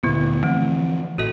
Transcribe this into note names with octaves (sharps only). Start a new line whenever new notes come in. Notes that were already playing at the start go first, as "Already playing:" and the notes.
D2 A#2 D3 B3 E4
E3 F3 A3 C4
A1 F#4 A4 D#5